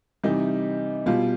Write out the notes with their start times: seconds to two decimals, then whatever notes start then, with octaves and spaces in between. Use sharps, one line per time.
0.23 C3 E3 G3 D#4
1.06 B2 G3 F4